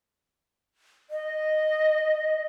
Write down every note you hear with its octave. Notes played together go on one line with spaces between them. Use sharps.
D#5